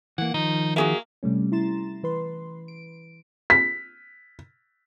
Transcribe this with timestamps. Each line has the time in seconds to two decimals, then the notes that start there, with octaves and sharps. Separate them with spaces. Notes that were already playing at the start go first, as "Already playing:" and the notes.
0.18 E3 A#3 F#5
0.34 D#3 F3 D#4
0.76 A#3 F#4 G#4 E5
1.23 C3 G3 A3 C#4
1.52 E4 A#5 C6 A6 E7
2.03 E3 B4 C6
2.68 D7
3.50 B6